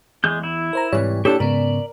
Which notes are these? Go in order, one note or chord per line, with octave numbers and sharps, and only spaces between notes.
E2 G#3 G6
E4
A#4 C5 A#5
G#2 C3 E3 G3 C#5
A#2 D4 E4 G4 A4 C#5 A5
G#2 C#3 B3 A#4 D5